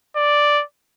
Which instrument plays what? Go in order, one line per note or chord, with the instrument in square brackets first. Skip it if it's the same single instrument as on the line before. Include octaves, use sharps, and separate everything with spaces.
[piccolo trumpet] D5